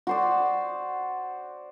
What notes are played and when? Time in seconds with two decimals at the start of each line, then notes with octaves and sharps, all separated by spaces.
0.07 F#4 C5 D5